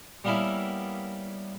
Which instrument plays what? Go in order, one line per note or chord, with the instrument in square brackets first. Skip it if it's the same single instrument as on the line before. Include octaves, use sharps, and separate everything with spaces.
[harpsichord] G3 A#3 B3 C#4 E4 E5